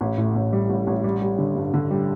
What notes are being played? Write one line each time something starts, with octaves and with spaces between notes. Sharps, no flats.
A1
A2
A1
G3
A1
A1
G3
G3
D3
G2
D3
G3